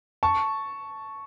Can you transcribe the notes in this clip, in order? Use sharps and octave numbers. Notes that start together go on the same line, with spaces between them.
A5 C#6